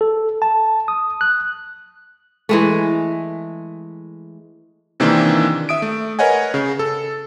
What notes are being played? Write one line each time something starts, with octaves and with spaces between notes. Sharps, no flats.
A4
A5
D#6
F#6
E3 G#3 A3
C3 D#3 E3 A#3 C4 D4
E5 D#6 D7
A3
A#4 B4 C#5 D#5 F#5 G#5
C#3
A4